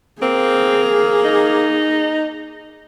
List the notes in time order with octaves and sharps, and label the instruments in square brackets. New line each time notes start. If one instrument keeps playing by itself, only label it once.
[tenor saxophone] A#3 [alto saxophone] C4 [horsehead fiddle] G#4
[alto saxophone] D#4